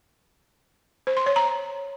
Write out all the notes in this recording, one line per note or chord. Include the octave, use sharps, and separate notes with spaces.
C5
C6
C#5
A#5